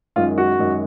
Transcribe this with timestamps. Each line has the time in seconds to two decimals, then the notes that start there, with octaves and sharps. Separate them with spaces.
0.16 F#2 D#3 G#3 F4
0.38 F#4
0.59 F#2 D#3 G#3